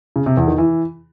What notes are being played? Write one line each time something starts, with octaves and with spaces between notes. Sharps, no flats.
C#3
C3
E2
D#3
E3